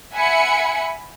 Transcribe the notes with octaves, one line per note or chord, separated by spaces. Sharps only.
E5 F#5 G#5 B5 C#7